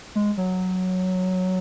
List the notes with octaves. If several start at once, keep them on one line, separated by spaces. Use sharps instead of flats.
G#3
F#3